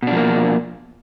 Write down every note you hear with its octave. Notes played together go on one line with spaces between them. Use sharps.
B2 F3 A#3 D4